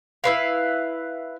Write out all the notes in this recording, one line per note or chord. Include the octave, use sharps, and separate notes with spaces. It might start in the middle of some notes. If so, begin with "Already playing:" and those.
E4 B4 F5